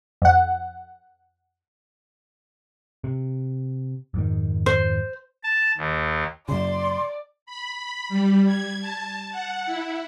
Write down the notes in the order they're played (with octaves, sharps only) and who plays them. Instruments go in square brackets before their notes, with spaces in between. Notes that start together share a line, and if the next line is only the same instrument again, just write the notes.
[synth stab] F2 F#5
[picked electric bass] C3
F2 G#2 D#3
[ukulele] C5
[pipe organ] A5
D#2
[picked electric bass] F#2 C#3 [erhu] D5 [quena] C6
[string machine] B5
B5
G3
G#6
A5
F#5
E4